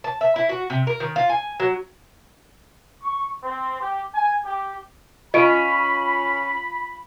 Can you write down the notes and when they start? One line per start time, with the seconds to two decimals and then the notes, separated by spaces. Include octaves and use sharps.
0.04 A5
0.21 E5
0.36 E4
0.49 F#4
0.70 C3
0.87 A#4
1.00 D#3
1.16 F4
1.29 G#5
1.60 F#3
3.02 C#6
3.42 C4
3.81 G4
4.14 G#5
4.46 G4
5.34 C#4 F4 D#5 B5 D7